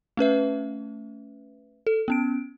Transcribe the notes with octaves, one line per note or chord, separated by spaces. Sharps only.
A3 C#4 B4 E5
A4
B3 C#4 D7